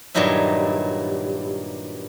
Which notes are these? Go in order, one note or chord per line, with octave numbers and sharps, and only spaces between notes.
G2 A#2 D#3 F#3 D#4 E4